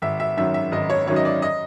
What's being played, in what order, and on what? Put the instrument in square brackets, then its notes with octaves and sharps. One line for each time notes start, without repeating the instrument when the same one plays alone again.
[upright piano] G#1 E5
E5
F#2 D#3 F#3 E5
E5
G#1 D#5
C#5
F#2 D#3 F#3 C#5
D#5
D5
D#5